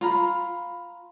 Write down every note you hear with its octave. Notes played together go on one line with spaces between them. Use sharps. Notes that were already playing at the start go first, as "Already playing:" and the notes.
F4 A#5 B5